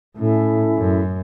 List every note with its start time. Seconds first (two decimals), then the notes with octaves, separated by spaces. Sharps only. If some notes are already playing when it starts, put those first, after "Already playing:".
0.16 A2 C#4 E4 A4 E5
0.78 F#2